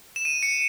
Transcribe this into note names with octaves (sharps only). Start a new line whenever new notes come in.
E7
D#7
C#7